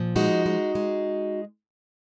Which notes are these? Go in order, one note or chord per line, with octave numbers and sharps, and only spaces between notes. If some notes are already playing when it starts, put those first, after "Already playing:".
Already playing: A#2 F3
G#3 D#4 F#4
G#3
G#3